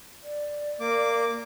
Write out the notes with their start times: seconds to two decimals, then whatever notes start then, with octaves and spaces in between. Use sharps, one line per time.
0.24 D5
0.80 A#3 D6